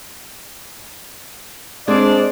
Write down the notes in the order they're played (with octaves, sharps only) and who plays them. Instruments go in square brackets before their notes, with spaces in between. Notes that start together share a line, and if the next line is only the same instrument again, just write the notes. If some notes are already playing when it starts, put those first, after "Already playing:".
[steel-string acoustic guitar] G#3 C4 C5 [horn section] D4 D5